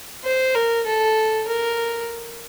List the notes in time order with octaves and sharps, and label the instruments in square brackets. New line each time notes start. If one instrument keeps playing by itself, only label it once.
[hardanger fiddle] C5
A#4
A4
A#4